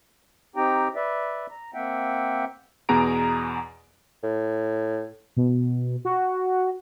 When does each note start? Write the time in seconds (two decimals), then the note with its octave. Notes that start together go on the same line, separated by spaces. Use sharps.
0.56 C4 D#4 G4 G5 A#5
0.95 B4 D5 E5
1.50 A#5
1.74 A#3 C4 E5 F#5 G5
2.89 E2 B2 B3 G#4 A#5 D7
4.23 A2
5.37 B2
6.05 F#4